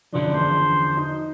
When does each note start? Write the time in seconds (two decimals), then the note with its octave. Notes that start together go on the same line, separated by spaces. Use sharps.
0.13 F#1 D3 F3 D4
0.33 E2 C5
0.97 D#4